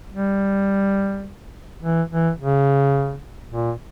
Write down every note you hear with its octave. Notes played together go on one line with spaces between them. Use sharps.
G3
E3
E3
C#3
A#2